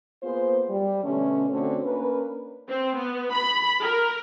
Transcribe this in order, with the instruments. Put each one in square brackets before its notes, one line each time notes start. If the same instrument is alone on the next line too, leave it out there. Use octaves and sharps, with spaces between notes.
[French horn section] A#3 B3 F4 G#4 C5
G3
B2 D3 A3 C#4
D3 A3 C4 C#4 F#4 A4
A#3 C#4 D4 A#4 B4
[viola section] C4
B3
B5
A#4